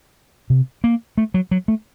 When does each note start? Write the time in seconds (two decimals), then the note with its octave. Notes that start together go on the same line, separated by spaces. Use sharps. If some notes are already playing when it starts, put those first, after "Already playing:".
0.50 C3
0.84 A#3
1.18 A3
1.34 F#3
1.51 F#3
1.68 A3